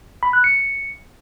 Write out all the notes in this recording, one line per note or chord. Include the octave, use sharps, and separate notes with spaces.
B5
F#6
C#7